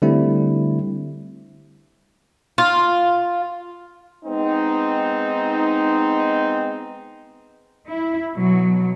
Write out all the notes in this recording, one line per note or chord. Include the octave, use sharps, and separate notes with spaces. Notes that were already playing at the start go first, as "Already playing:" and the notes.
D3 G3 A3 C4 E4
F4
G#3 B3 C4 D#4
E4
B2 F#3